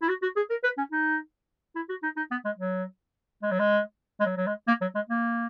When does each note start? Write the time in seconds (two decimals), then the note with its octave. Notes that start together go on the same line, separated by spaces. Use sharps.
0.02 E4
0.08 F#4
0.22 F#4
0.36 G#4
0.50 A#4
0.64 B4
0.78 C#4
0.92 D#4
1.76 E4
1.89 F#4
2.03 D#4
2.17 D#4
2.31 B3
2.45 G#3
2.59 F#3
3.43 G#3
3.51 F#3
3.59 G#3
4.20 G#3
4.26 F#3
4.37 F#3
4.47 G#3
4.68 A#3
4.81 F#3
4.95 G#3
5.09 A#3